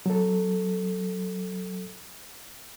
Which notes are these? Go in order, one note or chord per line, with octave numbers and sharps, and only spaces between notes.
F#3 A4